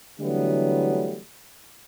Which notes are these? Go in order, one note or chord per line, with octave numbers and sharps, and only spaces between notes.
D3 E3 F#3 G3 A3 B3